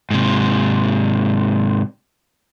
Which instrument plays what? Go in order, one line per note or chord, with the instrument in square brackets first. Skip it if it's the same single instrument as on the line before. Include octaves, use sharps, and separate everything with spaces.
[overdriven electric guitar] G#2 C3